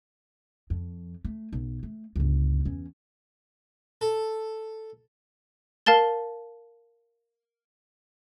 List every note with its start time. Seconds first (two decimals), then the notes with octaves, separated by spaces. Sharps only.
0.70 F2
1.25 A3
1.53 B1
1.83 A3
2.16 G1 C#2
2.65 E2 C#4
4.01 A4
5.86 A#4 F5 A5 A6 G7